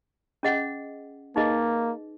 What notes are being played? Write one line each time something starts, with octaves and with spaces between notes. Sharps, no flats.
C#4 G#4 D#5 F#5
A#3 D#4 G#4 B4 D#5